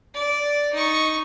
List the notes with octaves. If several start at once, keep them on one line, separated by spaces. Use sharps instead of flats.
D5
D#4 C#6